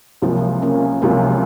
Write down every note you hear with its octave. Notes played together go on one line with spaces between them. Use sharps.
C#2 C3 F3 F#3 A#3
A#3 C#4
C#2 C3 F3 F#3 A#3